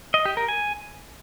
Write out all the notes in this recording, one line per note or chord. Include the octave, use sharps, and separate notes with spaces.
D#5
G4
A#4
G#5